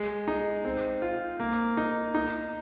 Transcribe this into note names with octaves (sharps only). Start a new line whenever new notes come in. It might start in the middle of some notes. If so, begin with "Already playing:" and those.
Already playing: G#3
D#4
C4
F4
A#3
D#4
D#4